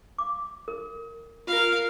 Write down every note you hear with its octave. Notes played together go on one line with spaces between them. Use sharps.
F5 D6
A#4
F4 A#4 F5